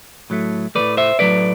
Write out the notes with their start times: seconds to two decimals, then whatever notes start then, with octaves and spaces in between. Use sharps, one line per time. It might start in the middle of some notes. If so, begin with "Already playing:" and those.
0.30 A2 F#3 A3
0.75 A2 F#3 A3 B4 D5
0.97 C5 E5
1.19 A2 F#3 A3 B4 D5